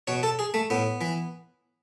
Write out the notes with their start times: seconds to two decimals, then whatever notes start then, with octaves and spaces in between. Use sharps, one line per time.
0.07 B2 C#5
0.23 A4
0.39 G#4
0.54 A3
0.70 A2 B3
1.01 E3